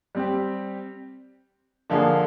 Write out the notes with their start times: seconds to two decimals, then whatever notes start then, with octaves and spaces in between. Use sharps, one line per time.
0.15 G3 C4 G4
1.90 D3 F3 A#3 D4 G#4